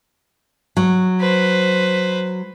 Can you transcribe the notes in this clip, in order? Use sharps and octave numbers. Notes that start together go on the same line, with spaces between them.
F#3
B4 C5